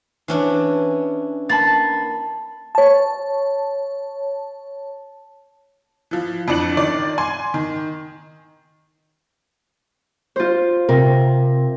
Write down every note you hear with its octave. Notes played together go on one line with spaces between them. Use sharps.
E3 C#4 D4
A#3 A5 B5 A6
C#5 A5
E3 F3
F2 E3 D4 C#7 F#7
D#3 D5
G#5 C6
D#3
F4 C5
C3 A#4